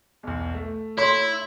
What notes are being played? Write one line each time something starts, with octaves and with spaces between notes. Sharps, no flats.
B1 E2
A3
E4 C#5 C6